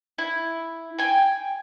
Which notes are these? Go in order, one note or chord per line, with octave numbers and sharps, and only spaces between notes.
E4
G5 G#5